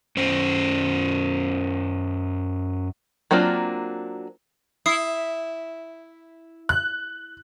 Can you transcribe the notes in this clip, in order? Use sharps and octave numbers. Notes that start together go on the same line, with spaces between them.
F#2 C#4 C5
F#3 A#3 C4 D4 F4
E4 D#6 C7
F#6